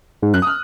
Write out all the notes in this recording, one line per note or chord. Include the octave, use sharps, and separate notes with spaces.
G#2
F#2 F#6
D#6
F6